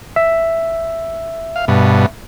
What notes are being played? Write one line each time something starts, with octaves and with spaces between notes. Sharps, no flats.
E5
F5
G2 B2